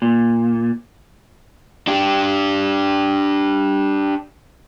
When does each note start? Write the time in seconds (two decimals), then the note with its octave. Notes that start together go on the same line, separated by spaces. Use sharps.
0.02 A#2
1.87 D4 G4